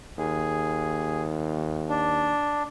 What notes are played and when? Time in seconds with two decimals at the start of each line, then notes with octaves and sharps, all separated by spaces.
0.18 D#2 G#4
1.89 D4